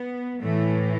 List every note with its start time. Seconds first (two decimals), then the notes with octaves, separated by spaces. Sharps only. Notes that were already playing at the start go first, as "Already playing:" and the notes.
Already playing: B3
0.42 A2 E3 A3